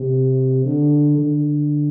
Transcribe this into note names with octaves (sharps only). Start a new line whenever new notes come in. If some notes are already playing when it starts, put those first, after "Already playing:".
Already playing: C3
D3
D3